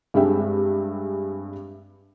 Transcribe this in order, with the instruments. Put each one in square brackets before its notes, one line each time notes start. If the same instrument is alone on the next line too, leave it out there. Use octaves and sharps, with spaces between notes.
[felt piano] G2 G#3 C4 D4 E5 G5